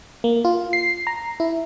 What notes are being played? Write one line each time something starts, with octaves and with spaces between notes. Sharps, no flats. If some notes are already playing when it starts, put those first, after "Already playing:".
A#3
F4
C7
A#5
E4